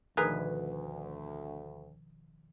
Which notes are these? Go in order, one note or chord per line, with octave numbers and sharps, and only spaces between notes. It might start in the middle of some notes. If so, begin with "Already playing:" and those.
D2 B2 D#3 F3 D#4 G#4 A#4 B4